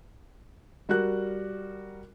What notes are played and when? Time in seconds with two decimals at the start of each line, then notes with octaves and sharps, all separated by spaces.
0.89 G3 F#4 A#4 F#6